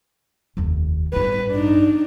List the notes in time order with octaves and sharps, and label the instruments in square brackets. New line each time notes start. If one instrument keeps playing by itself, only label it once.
[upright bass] F1 D#2
[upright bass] A1 G2 [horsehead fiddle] B4
[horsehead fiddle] D4 D#4